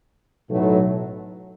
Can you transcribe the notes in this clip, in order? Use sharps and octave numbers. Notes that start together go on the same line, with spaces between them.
B1 A2 F#3 A3